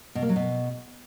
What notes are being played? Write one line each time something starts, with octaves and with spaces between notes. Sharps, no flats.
B2
A#3
F#3
B2